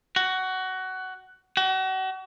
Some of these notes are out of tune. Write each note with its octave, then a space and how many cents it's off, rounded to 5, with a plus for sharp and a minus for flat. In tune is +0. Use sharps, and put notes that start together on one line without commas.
F#4 +15
F#4 +35